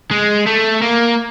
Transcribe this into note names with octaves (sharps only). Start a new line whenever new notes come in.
G#3
A3
A#3